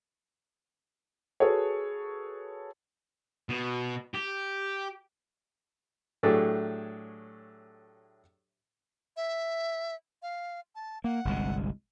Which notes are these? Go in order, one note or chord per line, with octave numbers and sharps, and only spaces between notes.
F#4 G#4 A4 B4 C#5
B2
G4
A2 F#3 A3 D4 G4 G#4
E5
F5
A5
A#3 F#5
G1 C2 G#3